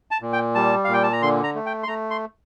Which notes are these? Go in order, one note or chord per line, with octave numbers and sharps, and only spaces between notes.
A5
A#2
G5
G3 A5
A#2 F5
G5
A5
A#5
D3 C6
A#5
A3
G5
C6
A3 A#5
C6